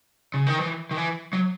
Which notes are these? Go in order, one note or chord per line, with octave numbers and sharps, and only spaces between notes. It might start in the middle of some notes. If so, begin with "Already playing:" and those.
C#3
D#3
E3
D#3
E3
F#3